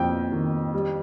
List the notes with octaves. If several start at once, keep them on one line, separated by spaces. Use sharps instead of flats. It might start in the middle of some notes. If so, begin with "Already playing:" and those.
Already playing: F2 A#3 G5
D#3
G3